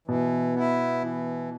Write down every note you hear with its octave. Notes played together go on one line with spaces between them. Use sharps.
B2 E3
B3 E4
E3